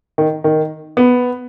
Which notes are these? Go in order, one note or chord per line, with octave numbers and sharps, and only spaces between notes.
D#3
D#3
B3